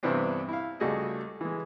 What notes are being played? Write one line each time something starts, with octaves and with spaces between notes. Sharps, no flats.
G2 C3 E3 B3 C4 D4
E4 F5
C#2 G3 A3 F#4 G#4 D#5
E3 G#3